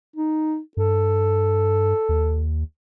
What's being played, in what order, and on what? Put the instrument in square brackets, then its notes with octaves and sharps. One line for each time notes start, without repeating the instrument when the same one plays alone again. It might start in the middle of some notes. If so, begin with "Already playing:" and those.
[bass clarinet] D#4
[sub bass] G2 [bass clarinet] A4
[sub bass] D#2